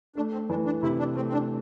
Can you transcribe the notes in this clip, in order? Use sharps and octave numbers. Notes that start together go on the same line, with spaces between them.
A3 D4
C4
E3 D4
D4
C3 E4
D4
A3 C4
C4
D4